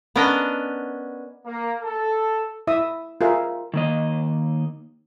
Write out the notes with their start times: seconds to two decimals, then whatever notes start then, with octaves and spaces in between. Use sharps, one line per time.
0.16 B3 C#4 D4 A#4 D#5
1.46 A#3
1.83 A4
2.67 E4 E5 D#6
3.21 F4 G#4 A#4 E5
3.74 D#3 A#3 D#5